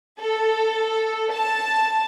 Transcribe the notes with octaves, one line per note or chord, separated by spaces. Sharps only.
A4
A5